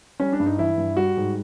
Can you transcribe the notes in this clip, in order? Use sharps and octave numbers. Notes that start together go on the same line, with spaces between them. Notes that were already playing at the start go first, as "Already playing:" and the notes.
G3 C#4
D4
G2
D#4
E3 E4
G2
G3 F#4
G#2